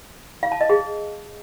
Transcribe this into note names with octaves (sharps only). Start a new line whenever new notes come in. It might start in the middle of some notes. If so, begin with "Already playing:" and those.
F5
A5
D#5
G#4